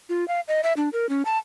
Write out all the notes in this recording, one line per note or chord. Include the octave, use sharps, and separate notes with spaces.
F4
F5
D#5
E5
D4
A#4
C#4
A5